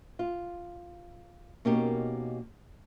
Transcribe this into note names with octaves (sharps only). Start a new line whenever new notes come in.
F4
B2 A#3 C#4 D#4 G4 A#4